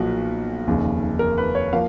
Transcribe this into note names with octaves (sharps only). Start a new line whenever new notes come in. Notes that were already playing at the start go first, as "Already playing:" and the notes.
Already playing: B1 A#2 F3 F#4
F1 D#2 C#3
A#4
B4
C#5
F3 A#3 F5